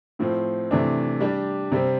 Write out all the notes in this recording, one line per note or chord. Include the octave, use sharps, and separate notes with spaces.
A2 F3 C4
C3 E3 A3 D4
G3 D4 G4
C3 G3 C4